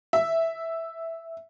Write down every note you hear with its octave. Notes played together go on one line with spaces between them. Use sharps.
E5